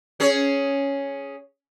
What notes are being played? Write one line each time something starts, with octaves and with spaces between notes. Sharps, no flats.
C#4 G#4 C#5